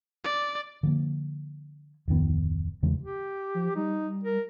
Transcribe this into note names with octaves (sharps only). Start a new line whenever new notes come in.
D5
D3 F3 A#3
D1 F2 D#3 B3
E2 C#3 E3 G#3
G4
F3
G3 D#4
A#4